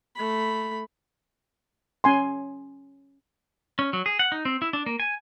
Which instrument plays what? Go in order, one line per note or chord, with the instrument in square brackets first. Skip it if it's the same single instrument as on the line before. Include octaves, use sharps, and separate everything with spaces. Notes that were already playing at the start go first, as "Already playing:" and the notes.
[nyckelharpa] A3 B5
[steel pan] C#4 G#5 C6
[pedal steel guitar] C#4
F#3
G#4
F#5
D#4
C4
E4
D4
A#3
G#5